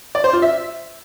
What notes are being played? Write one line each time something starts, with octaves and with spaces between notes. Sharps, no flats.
D5
C5
F4
E5